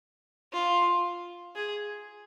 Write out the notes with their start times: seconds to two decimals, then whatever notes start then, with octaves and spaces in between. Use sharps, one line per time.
0.53 F4
1.55 G#4